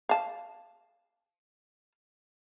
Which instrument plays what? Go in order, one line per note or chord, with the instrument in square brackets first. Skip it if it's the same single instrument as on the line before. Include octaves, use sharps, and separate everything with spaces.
[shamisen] F5 A5